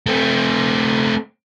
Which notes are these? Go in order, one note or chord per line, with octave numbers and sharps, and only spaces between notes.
A3 C4